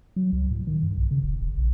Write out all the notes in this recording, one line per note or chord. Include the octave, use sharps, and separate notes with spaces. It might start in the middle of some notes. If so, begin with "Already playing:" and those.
F#3
C#2
A2
D#3
G2
B1
C#3
E1
F#1
A#1